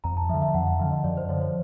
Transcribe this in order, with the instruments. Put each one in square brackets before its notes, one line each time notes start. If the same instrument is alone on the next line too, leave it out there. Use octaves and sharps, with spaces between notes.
[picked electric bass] F2 [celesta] A#5
[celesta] A5
[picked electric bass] F3 [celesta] E5
[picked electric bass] D3
[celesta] E5
[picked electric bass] F2 [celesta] F#5
[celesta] F5
[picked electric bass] D3 F3
[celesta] D#5
[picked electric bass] F#2 [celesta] D5
[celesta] C5
[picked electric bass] D3 F3 [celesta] C#5
[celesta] C#5